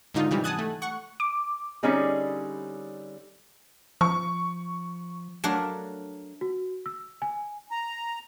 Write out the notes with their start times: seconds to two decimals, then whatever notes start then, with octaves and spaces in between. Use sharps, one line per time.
0.14 G#2 D3 D#4 F4
0.31 C3 D#3 E3 G3
0.44 F#5 G#5 A5 D#6 F#6 G#6
0.59 A3
0.82 F#5 C#6
1.20 D6
1.83 D3 G3 C4 C#4 D#4 G#4
4.01 F3 C#6
5.44 F#3 A3 D4 A#4 F5
6.41 F#4
6.86 E6
7.22 G#5
7.71 A#5